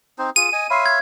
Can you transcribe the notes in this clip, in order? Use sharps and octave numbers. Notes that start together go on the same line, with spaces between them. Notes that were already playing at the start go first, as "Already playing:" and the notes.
C4 D#4 C5
F4 G#4 D#7
D#5 G#5
C#5 E5 F5 B5 C6 C7
G#6